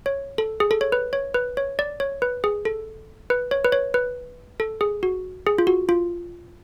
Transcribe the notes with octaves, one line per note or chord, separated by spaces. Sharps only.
C#5
A4
G#4
A4
C#5
B4
C#5
B4
C#5
D5
C#5
B4
G#4
A4
B4
C#5
B4
C#5
B4
A4
G#4
F#4
G#4
F4
F#4
F4